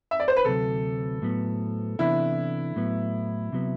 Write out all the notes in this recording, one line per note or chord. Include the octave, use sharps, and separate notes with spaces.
E5
D5
C5
B4
D2 C3 F#3 A4
A2 F#3 B3
C3 E3 B3 D4 E4
A2 F#3 B3
C3 F#3 B3